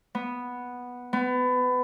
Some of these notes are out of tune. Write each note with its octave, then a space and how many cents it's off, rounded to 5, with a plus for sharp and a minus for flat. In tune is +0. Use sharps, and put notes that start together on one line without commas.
B3 -5
B3 +25